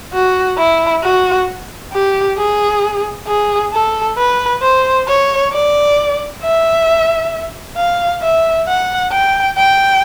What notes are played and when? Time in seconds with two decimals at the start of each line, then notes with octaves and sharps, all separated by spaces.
0.13 F#4
0.57 E4
1.03 F#4
1.93 G4
2.37 G#4
3.27 G#4
3.73 A4
4.17 B4
4.62 C5
5.08 C#5
5.52 D5
6.42 E5
7.77 F5
8.22 E5
8.67 F#5
9.12 G5
9.57 G5